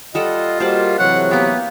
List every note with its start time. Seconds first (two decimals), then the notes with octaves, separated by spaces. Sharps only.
0.15 G3 F4 A4 D#5 F#5
0.60 G3 A#3 F#4 C5 D5 D#5 A5
0.99 A2 C3 E3 F#3 F#5
1.31 A#3 B3 G4